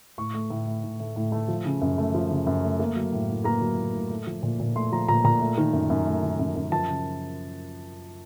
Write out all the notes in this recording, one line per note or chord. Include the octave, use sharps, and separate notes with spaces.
A2 C#6
A3
A2
A3
A2
A3
A2
A3
F3
C#3
F#2
A3
F3
C#3
F#2
A3
A#3
F#3
A2
A2
A#3 A#5
F#3
A2
A2
A3
F3
A#2
A#2
A3 C6
F3 A#5
A#2 A#5
A#2 A#5
A3
D#3
F#2
F#2
A3
D#3
F#2
F#2
F3 A5
C#3